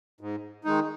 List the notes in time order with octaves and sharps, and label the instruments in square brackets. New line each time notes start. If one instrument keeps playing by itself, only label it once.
[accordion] G#2
D#3 G#3 D#4